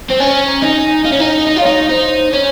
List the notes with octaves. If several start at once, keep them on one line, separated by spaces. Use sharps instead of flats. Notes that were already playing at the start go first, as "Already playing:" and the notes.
C4
C#4 G#5
A#5
D#4
G#5
D#4 F5
C#4
D#4
D#5
D#4
F4
D#4 C#5
D#4 C5
C#4